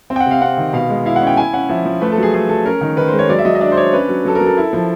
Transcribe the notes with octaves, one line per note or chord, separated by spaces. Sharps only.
C4
G5
F#5
C3
F5
C4 F#5
D#3
B2 F5
G#3
E4 F5
F#5
C#4
G5
E4 G#5
C#4 F#5
F3 E5
F3
A3 B4
A4
F#3
G#4
A3 G#4
F#3 A4
C#4 A#4
D#3
D#3 B4
C5
G#3
C#5
F#3 D5
E5
F#3 D#5
D#5
D4 D5
C5
D4 C#5
C#4 B4
F#3
F#3 A4
A#4
F#3
A4
E4
F3